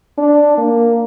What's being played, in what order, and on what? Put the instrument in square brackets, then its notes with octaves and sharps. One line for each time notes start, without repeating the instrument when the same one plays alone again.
[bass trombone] D4
A#3